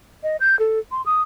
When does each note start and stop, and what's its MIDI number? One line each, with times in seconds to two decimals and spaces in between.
0.23 0.36 75
0.40 0.58 91
0.59 0.79 69
0.91 1.04 84
1.06 1.22 87